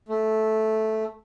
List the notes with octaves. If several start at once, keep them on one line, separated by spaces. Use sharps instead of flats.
A3